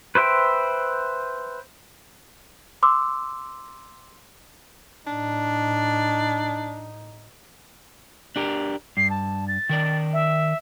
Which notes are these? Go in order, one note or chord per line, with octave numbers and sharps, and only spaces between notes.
B4 C5 E5 G5
C6 D6 E6
A2 D4 D#4
D4 G4 A#4
G2 C7
A5
A6
D#3 A#4 D5
E5